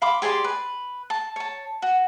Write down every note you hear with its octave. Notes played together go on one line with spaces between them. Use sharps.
F5 B5 C6 D6
G4 G#4 D5 C6
B4
A5
C#5 A5
F#4